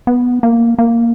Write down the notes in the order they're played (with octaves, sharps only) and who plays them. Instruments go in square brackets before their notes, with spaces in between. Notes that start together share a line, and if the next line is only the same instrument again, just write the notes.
[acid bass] B3
A#3
A#3